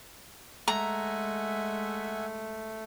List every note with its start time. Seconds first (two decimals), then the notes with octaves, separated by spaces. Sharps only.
0.68 G#3 A3 E5 F#5 G#5 A#5